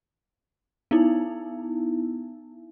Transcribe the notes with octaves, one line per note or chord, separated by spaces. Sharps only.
B3 D#4 E4